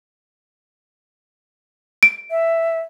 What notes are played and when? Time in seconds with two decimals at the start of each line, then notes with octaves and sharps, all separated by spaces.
2.03 D7
2.31 E5